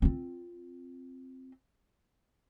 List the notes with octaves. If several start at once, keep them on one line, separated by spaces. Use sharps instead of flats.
C4 F4